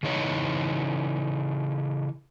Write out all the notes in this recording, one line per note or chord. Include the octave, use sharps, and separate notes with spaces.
C#3 E3 D#4 C#5 F#5